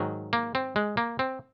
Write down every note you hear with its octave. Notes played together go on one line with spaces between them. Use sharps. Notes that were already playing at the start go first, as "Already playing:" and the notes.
Already playing: G#2 D#3 F#3
A#3
C4
G#3
A#3
C4